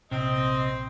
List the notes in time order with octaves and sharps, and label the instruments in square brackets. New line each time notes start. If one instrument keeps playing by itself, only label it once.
[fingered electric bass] A#1 [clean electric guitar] C3 [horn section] C4 [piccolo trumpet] D#5